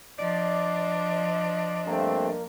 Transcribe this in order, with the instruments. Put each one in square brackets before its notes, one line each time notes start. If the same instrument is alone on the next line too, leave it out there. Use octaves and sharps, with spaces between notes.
[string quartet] F3 D4 [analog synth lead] D5 [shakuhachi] D#5
[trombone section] G2 A3 C4 [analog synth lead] A#3